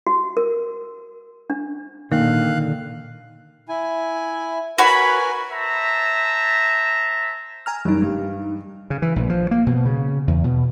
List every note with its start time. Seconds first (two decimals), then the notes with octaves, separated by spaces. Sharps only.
0.07 F#4
0.37 A#4
1.50 D4
2.12 A#2 D3 D#3 A#3 F5 F#6
3.69 E4 G#5
4.78 F#4 A#4 B4 C#5 G#5 B5
5.51 C5 E5 A5 A#5
7.66 G#5 A#5 F6
7.85 F#1 G3 D#4
8.02 G2
8.90 C#3
9.02 E3
9.16 A#1
9.30 F3
9.51 A#3
9.67 B2
9.85 C#3
10.27 E2
10.44 B2